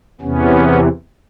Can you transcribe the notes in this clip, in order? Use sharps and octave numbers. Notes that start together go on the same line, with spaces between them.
E2 C3 E3 B3 C#4